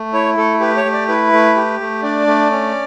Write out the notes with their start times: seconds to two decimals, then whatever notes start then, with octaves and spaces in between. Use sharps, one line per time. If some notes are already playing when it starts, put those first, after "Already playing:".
Already playing: A3
0.13 E4 C#5
0.37 A3 A4
0.60 G4 B4
0.77 C#5
0.85 A3
0.93 D5
1.08 E4 B4
1.32 A3
1.56 G4
1.80 A3
2.03 D4 D5
2.27 A3
2.51 C#4